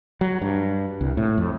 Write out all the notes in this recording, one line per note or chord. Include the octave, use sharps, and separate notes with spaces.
F#3
G2
C2
A2
F2